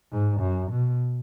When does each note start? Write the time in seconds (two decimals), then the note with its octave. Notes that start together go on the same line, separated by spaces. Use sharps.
0.12 G#2
0.41 F#2
0.71 B2